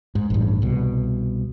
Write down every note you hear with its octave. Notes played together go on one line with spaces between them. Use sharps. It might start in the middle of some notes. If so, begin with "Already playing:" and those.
G#2
A1 G2
C2 B2